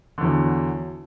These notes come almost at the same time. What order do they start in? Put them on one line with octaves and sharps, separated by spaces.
D3 E2 F#3